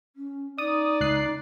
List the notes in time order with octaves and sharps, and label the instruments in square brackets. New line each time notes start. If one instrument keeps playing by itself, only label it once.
[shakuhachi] C#4
[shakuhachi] D#4 [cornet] D5 [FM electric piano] D#6
[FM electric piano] C#2 F#6 C7